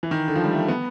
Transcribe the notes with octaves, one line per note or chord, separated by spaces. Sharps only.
E3
D#3
D3
F3
G3
A3
B3